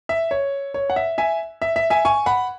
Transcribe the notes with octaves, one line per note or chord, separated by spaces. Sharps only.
E5
C#5
C#5
F#5
E5
E5 G#5
E5
E5
E5 G#5
G#5 C#6
F#5 B5